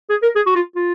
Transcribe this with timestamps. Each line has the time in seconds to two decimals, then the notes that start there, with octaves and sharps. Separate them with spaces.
0.10 G#4
0.23 A#4
0.35 G#4
0.46 F#4
0.55 F4
0.75 F4